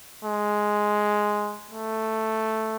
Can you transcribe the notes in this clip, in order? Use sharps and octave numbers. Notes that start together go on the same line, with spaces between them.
G#3
A3